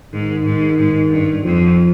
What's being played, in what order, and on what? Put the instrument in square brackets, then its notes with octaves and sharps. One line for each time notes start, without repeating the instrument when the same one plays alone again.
[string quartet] G#2 [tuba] D#3
[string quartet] G#2
G#2
G2
[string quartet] F2 [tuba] F3